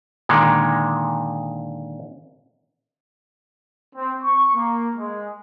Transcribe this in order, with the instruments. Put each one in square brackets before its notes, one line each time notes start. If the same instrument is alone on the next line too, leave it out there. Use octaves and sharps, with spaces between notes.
[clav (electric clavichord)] A#2 D3 D#3 G#3
[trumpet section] C4
C#6
A#3
G#3